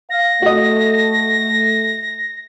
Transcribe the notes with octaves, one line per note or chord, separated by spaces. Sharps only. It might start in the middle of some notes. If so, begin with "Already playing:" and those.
F5 A#6
A3 F#4 D#5